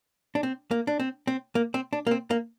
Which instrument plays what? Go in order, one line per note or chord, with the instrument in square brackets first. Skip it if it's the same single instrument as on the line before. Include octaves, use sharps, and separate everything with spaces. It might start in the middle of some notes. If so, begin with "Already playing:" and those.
[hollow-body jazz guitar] D4
C4
A#3
D4
C4
C4
A#3
C4
D4
A#3
C4
A#3